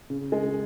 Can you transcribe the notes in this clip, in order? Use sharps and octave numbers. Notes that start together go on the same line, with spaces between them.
C#3
G#3